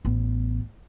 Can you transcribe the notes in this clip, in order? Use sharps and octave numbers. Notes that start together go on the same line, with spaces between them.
A1 B3